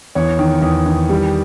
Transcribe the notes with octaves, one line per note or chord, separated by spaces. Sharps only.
E2 C#5
D#3
E2
D#3
G3